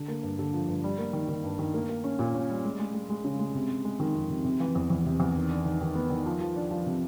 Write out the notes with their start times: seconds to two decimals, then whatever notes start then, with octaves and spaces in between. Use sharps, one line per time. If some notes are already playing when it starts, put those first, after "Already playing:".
Already playing: D3
0.08 A#3
0.23 G2
0.39 D3
0.54 F3
0.68 G2
0.84 G3
0.98 A#3
1.13 D#3
1.28 D#3
1.44 G2
1.59 D#3
1.74 A#3
1.89 A#3
2.04 C#4
2.19 A#2
2.34 C#4
2.49 G3
2.64 G#3
2.79 G#3
2.94 G#3
3.10 G#3
3.25 C#3
3.39 G#3
3.55 C3
3.70 C3
3.85 G#3
4.00 D#3
4.15 F2
4.30 C3
4.45 C3
4.60 E3
4.75 E2
4.90 E2
5.05 C3
5.20 E2
5.36 D#3
5.50 D4
5.65 D#3
5.81 D#3
5.95 B3
6.10 D#3
6.26 F3
6.40 F3
6.56 D4
6.71 F3
6.86 C3